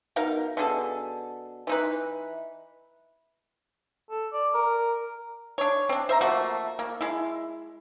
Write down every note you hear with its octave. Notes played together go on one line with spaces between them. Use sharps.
B2 D#4 A#4 F5
B2 D4 G#4 A4
E3 D#4 B4
A4
D5
A#4
D4 C#5
C4 D4
C5 E5 A#5
F3 A3 A#3 F#4
A#3
G#3 E4